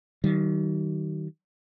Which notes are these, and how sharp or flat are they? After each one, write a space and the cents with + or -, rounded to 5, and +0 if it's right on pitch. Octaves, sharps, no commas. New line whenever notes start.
D#3 +5 G3 -45